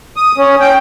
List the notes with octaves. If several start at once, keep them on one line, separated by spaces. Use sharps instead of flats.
D#6
C#4
G5